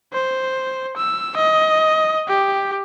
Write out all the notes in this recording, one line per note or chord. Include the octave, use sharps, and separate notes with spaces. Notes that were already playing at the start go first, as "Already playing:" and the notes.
C5
E6
D#5
G4